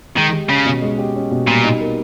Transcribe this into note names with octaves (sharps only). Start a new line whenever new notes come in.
D#3 G#3
G4
C#3 C#4
B2
G#3
G4
C#4
B2
A#2 G3
D#4
A#3